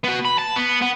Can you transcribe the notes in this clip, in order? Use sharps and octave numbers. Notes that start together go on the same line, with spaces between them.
B3 F#4
B5
A5
B3
B3